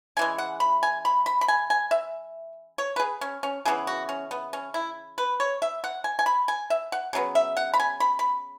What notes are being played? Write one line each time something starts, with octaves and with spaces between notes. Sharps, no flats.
C#3 E3 G#3 G#5
F#5
B5
G#5
B5
B5
B5
G#5
G#5
E5
C#5
B4
G#4
C#4
C#4
C#3 E3 B3 G#4
F#4
C#4
B3
C#4
E4
B4
C#5
E5
F#5
G#5
G#5
B5
G#5
E5
F#5
C#3 F#3 B3
E5
F#5
B5
G#5
B5
B5